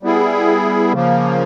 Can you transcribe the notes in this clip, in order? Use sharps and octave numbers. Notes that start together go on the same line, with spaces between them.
G3 B3 E4 G#4
C#3 F3 A#3